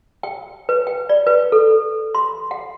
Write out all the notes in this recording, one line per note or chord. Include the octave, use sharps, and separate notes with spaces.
G5
B4
G5
D5
B4
A4
C6
F#5